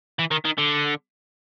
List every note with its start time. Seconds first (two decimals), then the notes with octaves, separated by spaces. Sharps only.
0.19 E3
0.31 D#3
0.45 D#3
0.58 D3